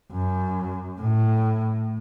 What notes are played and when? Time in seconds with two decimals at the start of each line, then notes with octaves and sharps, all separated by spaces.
0.11 F#2
1.01 A2